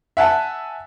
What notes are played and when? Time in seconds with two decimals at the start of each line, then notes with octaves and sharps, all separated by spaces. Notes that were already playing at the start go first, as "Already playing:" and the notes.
0.17 E5 F#5 G#5 A5